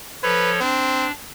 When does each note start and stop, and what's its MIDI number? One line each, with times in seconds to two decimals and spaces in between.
0.23 0.60 53
0.23 0.60 69
0.23 0.51 71
0.23 0.60 73
0.60 1.08 60
0.60 1.11 62